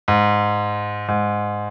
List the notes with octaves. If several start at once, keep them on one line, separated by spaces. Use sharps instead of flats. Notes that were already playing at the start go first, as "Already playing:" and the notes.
G#2
G#2